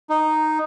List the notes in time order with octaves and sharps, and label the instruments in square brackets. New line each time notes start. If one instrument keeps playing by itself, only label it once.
[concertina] D#4